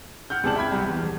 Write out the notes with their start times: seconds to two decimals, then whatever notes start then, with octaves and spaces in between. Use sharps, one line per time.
0.30 F#5 F6 G6
0.43 C#2 C3 G#4 D5 A5 F#7
0.56 E5 G5 B5 G#6
0.72 C2
0.86 E2
1.02 D#1